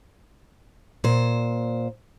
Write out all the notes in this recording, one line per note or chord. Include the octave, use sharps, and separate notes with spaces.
A#2 C5